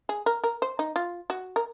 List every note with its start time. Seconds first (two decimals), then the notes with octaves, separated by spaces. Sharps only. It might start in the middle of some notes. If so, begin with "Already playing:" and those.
0.09 G#4
0.26 A#4
0.44 A#4
0.62 C5
0.79 D#4
0.96 F4
1.30 F#4
1.56 A#4